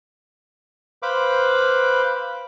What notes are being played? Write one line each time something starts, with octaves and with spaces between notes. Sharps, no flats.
B4 C5 F5 B5 D6